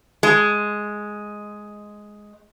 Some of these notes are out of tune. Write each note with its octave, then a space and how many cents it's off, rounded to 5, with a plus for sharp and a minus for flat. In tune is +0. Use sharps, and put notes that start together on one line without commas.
G#3 +5